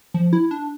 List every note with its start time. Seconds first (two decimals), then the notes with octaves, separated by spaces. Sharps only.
0.14 F3
0.33 E4
0.51 D4